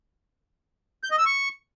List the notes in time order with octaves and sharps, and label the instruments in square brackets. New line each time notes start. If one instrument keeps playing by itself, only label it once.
[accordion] G6
D#5
E6
C#6